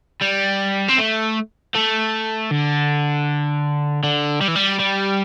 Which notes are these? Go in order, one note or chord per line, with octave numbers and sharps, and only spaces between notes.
G3
C4
A3
A3
D3
D3
G3
E3
G3
G3